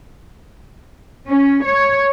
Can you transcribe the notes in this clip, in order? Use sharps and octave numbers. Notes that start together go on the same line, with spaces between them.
C#4
C#5